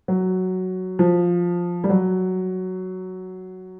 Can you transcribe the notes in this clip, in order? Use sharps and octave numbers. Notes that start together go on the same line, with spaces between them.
F#3
F3
G3
F#3